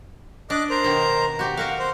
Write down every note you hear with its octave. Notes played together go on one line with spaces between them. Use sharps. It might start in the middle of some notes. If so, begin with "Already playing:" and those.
D4 D#5 D6 F#6
A#4 C5 A#5
B2 D#3
F#4 G4
F#4 A#4 F5 F#5
C5